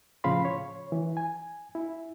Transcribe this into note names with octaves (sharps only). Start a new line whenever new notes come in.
A2 C#3 F3 F5 B5 C6
C#5
E3
G#5
E4